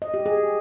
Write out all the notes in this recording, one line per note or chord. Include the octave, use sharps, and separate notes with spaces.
D#5
G4
G#4